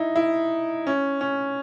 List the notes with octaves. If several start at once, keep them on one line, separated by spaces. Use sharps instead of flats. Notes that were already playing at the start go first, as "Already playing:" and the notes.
Already playing: D#4 E4
E4
C#4
C#4